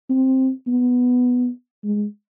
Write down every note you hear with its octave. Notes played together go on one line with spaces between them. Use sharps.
C4
B3
G#3